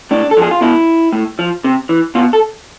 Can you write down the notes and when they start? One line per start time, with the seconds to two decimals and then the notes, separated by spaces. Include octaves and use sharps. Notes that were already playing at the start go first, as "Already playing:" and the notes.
0.11 A2 D4
0.31 A4
0.37 F3 G#4
0.51 F4
0.61 B2 E4
1.12 A2
1.39 F3
1.64 C3
1.89 E3
2.15 B2 F4
2.33 A4